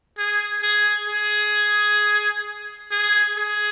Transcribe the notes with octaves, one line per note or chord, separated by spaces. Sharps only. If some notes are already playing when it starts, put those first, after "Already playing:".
G#4
G#4
G#4
G#4
G#4